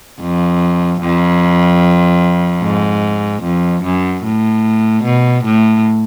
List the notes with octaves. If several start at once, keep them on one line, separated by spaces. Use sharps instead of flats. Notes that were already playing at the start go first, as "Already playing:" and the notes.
F2
F2
G#2
F2
F#2
A2
B2
A2